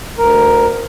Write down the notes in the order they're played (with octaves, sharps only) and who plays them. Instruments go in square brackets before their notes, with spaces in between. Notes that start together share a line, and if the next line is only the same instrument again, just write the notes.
[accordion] D2 A#4